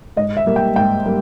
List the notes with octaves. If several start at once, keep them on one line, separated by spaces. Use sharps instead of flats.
G#2 D#5
E5
G3 A#3
G5
G#2 G5
G3 A#3